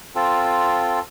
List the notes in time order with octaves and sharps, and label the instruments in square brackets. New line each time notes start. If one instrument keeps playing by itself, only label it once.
[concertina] C4 F4 A4